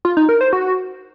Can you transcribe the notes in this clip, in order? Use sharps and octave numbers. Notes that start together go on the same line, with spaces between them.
F4
D#4
A#4
C5
F#4